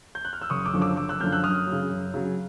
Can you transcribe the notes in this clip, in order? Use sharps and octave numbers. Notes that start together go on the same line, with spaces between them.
G6
F#6
F6
E6
F#1 C#6 D#6
D6 E6
F#2 D3 F3
D6 E6
F#1 D6 E6
E6 F#6
F#2 D3 F3 F6 G6
E6 F#6
F#2 D#6 F6
F#3
C#3
F#2
C#3 F#3